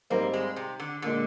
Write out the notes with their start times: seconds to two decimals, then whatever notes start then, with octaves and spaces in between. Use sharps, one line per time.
0.10 G#2 G3 A#3 C4
0.33 G#3
0.56 C3
0.80 D3
1.02 A#2 D3 G#3